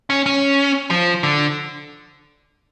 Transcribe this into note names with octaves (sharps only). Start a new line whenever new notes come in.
C#4
C#4
F3
D3